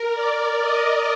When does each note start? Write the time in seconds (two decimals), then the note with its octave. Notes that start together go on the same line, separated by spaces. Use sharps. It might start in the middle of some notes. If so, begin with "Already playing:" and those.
Already playing: A#4
0.12 D5
0.60 D#5